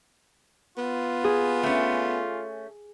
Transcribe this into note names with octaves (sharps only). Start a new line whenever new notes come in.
B3 F4
G#4
A3 C#4